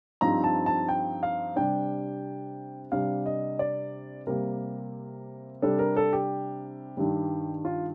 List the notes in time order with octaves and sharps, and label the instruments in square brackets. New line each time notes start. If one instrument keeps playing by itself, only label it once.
[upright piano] G2 F3 C4 D#4 A#5
A5
A5
G5
F5
C3 G3 D4 G5
C3 G3 D4 F5
D#5
D5
C3 G3 A#3 A#4
C3 G3 D4 A4
A#4
A4
G4
G2 D#3 G3
F4